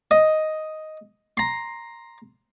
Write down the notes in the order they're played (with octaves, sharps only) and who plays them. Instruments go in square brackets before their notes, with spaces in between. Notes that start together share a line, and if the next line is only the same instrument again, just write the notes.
[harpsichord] D#5
A#5 C6